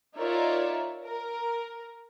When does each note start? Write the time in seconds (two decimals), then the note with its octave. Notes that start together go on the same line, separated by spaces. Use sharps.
0.17 D#4 F4 A#4 C#5 D5 E5
1.03 A#4